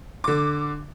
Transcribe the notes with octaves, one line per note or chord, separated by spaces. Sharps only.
D3 D6